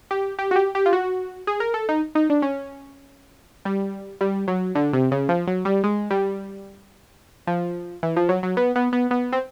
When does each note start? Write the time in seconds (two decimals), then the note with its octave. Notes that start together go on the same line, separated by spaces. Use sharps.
0.11 G4
0.39 G4
0.51 F#4
0.56 G4
0.75 G4
0.86 F4
0.93 F#4
1.47 G#4
1.60 A#4
1.74 A4
1.89 D#4
2.15 D#4
2.30 D4
2.42 C#4
3.65 G3
4.21 G3
4.48 F#3
4.75 D3
4.93 C3
5.11 C#3
5.29 F3
5.47 F#3
5.65 G3
5.84 G#3
6.11 G3
7.47 F3
8.03 E3
8.16 F3
8.29 F#3
8.43 F#3
8.57 B3
8.76 B3
8.93 B3
9.11 B3
9.33 C4